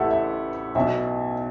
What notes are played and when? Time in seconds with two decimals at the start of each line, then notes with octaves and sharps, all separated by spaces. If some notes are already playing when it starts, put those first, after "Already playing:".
Already playing: A1 A2 E3 G4 A4 E5 F#5
0.11 E5
0.75 B1 B2 E5